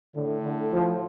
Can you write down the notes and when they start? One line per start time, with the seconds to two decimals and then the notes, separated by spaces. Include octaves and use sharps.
0.15 A2 D3
0.44 D3
0.73 F3